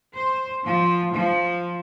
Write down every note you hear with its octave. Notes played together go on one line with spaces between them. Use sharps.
C5
F3
F3